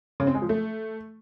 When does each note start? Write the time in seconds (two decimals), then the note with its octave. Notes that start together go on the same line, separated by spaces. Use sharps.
0.20 C#3
0.27 C4
0.35 G#3
0.42 F3
0.49 A3